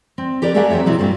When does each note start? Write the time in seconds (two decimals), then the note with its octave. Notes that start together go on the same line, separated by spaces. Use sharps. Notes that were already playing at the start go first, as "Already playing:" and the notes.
0.18 C4
0.42 G4 A#4 B4 D5
0.54 A3 G4 G#4 A#4 E5 F#5
0.70 F#3 C4 C5 C#5 E5
0.85 B2 F#3 C4 E4
0.99 G2 F#3 G3 A#3